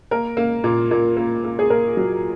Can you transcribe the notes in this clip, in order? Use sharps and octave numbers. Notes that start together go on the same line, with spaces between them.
A#3 A#4
A#3
A#2
A#2
A#3
A#3
G#4
A#3 A#4
F#3